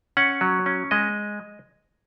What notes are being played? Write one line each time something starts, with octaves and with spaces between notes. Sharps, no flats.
C#4 F#5
F#3
C#4
G#3 D#5